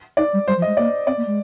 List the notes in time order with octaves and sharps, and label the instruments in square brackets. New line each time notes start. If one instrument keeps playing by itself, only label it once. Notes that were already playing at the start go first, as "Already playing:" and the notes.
[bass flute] D#4 [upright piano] D5
[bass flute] G3
[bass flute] G3 [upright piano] C5
[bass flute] F3
[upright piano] D#5
[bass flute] G#3
[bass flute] A#3 [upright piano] D5
[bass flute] C4 [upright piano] D5
[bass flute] A#3
G#3